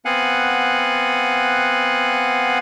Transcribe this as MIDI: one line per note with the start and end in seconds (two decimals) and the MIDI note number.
0.05 2.59 59
0.05 2.59 60
0.05 2.59 77
0.05 2.59 78
0.05 2.59 80
0.05 2.59 90